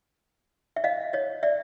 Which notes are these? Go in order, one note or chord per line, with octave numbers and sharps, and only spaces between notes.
E5
D#5 F5
C#5 D#5
D5 E5